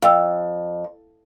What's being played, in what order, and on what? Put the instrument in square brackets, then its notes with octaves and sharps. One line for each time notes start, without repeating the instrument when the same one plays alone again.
[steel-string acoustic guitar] F2 [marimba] F5 G5 E6